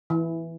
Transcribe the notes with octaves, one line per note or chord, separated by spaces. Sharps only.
E3